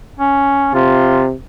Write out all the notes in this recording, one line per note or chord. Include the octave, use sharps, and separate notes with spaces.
C#4
C3 F4